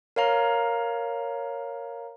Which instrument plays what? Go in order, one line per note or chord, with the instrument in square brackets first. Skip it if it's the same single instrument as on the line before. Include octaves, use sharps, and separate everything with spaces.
[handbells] A#4 C#5 F5 A#5